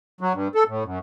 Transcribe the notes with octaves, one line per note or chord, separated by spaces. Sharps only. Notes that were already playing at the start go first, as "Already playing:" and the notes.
F#3
G2
A4
A2
F#2